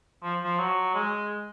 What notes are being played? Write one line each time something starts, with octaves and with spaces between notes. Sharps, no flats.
F3
F3
F#3
G#3